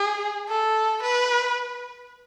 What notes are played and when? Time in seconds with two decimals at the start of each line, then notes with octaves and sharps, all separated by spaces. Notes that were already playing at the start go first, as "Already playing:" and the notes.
Already playing: G#4
0.49 A4
1.03 B4